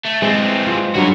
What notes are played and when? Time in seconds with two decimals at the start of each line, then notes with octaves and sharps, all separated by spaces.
0.05 A3
0.22 E3 G#3 C4
0.67 G#3 F4
0.95 G2 F#3 F#4 A#4